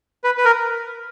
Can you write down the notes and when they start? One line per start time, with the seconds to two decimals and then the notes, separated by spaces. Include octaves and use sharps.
0.24 B4
0.38 B4
0.45 A#4